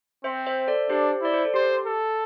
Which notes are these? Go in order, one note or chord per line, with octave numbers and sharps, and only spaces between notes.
C4 C5 E5
C5 E5
A4 D5
D4 G4 C5
E4 D5
C5
A4
G4 C5
A4